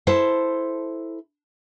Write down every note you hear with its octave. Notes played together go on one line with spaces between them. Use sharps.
E4 A4 C5